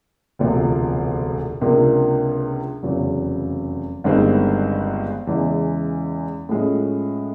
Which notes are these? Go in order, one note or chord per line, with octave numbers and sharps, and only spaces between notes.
E1 D2 C3 F3
C#2 C3 F3 A#3 D4
F1 E2 C#3 F#3
G1 G2 D#3 G#3 C4
E2 C#3 E3 G#3
A2 F3 G#3 C#4